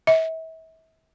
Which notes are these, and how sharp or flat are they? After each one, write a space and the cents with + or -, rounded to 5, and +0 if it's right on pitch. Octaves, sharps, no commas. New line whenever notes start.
E5 -35